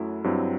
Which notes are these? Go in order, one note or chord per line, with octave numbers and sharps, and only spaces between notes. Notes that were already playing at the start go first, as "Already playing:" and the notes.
Already playing: F#2 F#3 A3 E4
G2 F#3 C4 E4